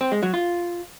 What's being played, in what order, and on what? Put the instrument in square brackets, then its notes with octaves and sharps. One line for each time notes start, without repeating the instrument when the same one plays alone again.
[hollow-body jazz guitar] C4
G#3
F#3
F4